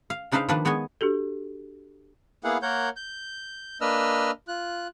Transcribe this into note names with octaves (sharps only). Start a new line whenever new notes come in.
F5
C#3 D4 D#4 B4 C5 F5
D#3 F3 A#3 D4 B4
G#3 B3 C#5 D#5 G#5
D4 F#4 G4 A4
A#3 B3 E4 G#4 F5 F#5
A#3 A#4 C#5 F#5 G6
G6
A#3 D4 B4 D#5 E6 F6
F4 F#6